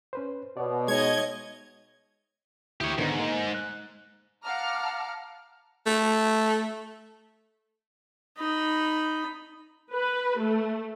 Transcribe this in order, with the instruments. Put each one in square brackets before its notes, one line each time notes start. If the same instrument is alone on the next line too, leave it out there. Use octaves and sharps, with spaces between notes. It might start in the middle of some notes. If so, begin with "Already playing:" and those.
[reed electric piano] C#4 B4 C5
[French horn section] B2 [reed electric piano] C#5 D5
[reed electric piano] G#3 D#4 [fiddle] C#5 D#5 [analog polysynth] G#6
[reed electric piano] D2 E4 D#6 [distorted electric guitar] G4 C#5
[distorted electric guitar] G#2 [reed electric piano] D3 D#3 B3
[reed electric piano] A#3
F#6
[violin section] F5 F#5 A5 A#5 D6 F6
[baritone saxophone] A3
[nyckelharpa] D#4 B5
[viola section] B4
A3